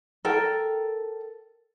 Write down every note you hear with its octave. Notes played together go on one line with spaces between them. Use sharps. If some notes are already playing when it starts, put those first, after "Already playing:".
A4 A#4 G5